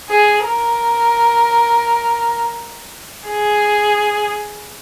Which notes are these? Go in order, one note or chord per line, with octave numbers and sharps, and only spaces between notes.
G#4
A#4
G#4